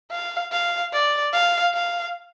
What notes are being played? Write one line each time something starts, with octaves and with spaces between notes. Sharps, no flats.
F5
F5
D5
F5
F5